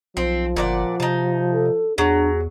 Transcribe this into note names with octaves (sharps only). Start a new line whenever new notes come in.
B1 F3 C4
G1 A#2 D5 F#5
C3 D#4 A5
A4
E2 F#3 D4 G#4